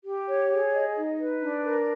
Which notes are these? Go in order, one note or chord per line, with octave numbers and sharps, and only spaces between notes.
G4
C#5
G#4
D#5
D#4
B4
D4
A#4